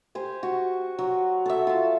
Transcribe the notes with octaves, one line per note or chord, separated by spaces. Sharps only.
G4 C5 G#5
F#4
F#3
A4 E5
F4 A5